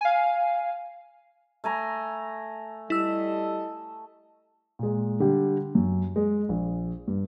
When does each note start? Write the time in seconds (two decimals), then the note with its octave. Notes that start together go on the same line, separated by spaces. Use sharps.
0.01 F5 G#5
1.64 A3 G#5 A#5
2.90 G3 E4 A4 D#5 E6
4.79 A#2 G#3
5.20 D3 G3 G4
5.75 F#2
6.16 G#3
6.49 A#1
7.08 G2